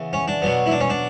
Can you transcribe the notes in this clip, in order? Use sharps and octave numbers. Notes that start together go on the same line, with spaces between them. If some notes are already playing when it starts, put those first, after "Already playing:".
Already playing: C#3 E3 B3
C#4
D4
B2 F#3 B3
E4
D4
C#4
D4